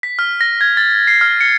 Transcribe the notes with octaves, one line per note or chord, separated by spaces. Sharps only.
B6
F6
A#6
G#6
A6
C7
F6
C#7